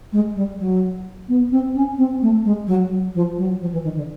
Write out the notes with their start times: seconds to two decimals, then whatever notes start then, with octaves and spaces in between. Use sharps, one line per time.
0.12 G#3
0.35 G3
0.59 F#3
1.28 B3
1.51 C4
1.75 C#4
1.98 C4
2.22 A3
2.44 G#3
2.67 F#3
2.91 F#3
3.14 F3
3.37 F#3
3.61 F3
3.72 E3
3.83 D#3
3.95 D3